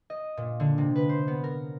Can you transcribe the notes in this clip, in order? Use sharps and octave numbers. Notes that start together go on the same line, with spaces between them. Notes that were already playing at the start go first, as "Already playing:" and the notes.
D#5
A#2
D3
C3
B4
C5
B3
A#4